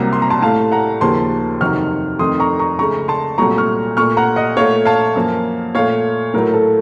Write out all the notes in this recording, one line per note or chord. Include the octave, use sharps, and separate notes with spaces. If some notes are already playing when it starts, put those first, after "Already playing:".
Already playing: C2 C3 F#3 A#3 A#5
C6
A#5
A5 C6
A2 A3 F5 A5
F#5 A#5
D#2 C#3 F3 A#3 A5 C6
F2 C3 D#3 F#3 C#6 F6
F2 D#3 A3 C6 D#6
A#5 C#6
A#5 C#6
C#2 C#3 A3 A#5 C#6
A5 C6
C2 A#2 F#3 A3 A#5 C#6
C#6 F6
A#2 A3 C#6 F6
F#5 A#5
D#5 F#5
A#2 A3 C#5 F5
F5 A5
F#2 F3 A#3
A#2 A3 C#5 F5
A2 F#3 A3 A#4
A4